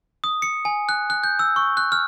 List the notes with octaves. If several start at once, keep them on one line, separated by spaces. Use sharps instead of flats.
D#6
C#7
G#5
F#6
F#6
G6
E6
C#6
F#6
F6